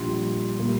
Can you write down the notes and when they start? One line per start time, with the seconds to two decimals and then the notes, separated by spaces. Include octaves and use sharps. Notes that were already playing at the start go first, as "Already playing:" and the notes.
Already playing: A#1 A#2 G3 C6
0.59 A#2 G3 A#3